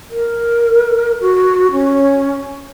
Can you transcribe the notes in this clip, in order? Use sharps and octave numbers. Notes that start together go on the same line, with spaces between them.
A#4
F#4
C#4